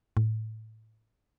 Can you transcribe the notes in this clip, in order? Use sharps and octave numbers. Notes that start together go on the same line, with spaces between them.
A2